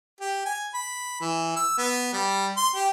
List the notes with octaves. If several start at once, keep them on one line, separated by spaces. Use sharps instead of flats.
G4
G#5
B5
E3
E6
B3
G3
C6
G4